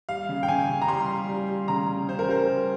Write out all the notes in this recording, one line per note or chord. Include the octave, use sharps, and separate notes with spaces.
G3 F5
C#3
G5
C#3 G#5
C#3
A#5
G3 C6
G3
G3
G3
C#3 A#5
C#3
C#3 C5
A#4
G3 C5
G3